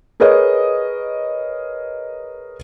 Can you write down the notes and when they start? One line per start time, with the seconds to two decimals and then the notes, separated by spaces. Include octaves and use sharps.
0.20 G#4 A#4 B4 C#5 D#5